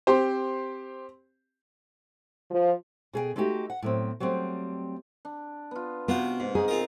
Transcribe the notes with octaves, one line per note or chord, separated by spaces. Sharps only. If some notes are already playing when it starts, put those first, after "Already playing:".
C4 G4 C5
F3
B2 G#4 A4 G5
G#3 A3 D#4 F#4 G4
F#5
A2 F#3 C4
F#3 G3 A3 C4
D4
B3 F4
C3 B3 F4 F#4 G5
G#2
D#4 G#4
C4 F4 A#4